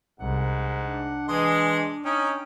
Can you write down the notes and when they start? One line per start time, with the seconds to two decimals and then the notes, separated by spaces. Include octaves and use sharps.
0.20 C2 G#2 F#5
0.85 D4
1.28 E3 G#3 D#5 C6
2.05 C#4 D#4 G5